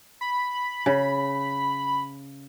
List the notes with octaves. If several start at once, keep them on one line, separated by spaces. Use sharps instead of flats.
B5
C#3